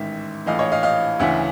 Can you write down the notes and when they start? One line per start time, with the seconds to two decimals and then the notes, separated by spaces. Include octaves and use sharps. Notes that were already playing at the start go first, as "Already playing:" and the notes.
Already playing: A1 G#2 D#3 E5
0.46 A#1 A2 E3 D#5 F5
0.59 C#5 D#5
0.71 D#5 F5
0.83 D#5 F5
1.19 D2 C#3 E3 E5 F#5